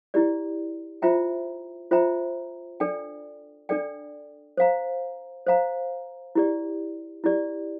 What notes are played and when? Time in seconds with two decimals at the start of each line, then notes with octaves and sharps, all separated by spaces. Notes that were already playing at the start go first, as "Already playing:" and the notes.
0.14 E4 G4 D5
1.02 F4 C5 E5 G5 A#5
1.91 F4 C5 E5 G5 A#5
2.80 D4 A4 D5 G5
3.69 D4 A4 D5 G5
4.57 C5 F5 A#5
5.47 C5 F5 A#5
6.35 E4 G4 D5
7.24 E4 G4 D5